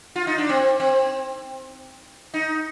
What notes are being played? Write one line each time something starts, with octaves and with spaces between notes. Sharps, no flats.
F4
D#4
D4
C4
C4
D#4